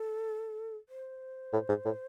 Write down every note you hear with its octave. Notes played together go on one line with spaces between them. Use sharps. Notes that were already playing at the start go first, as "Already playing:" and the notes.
Already playing: A4
C5
A2
G#2
A2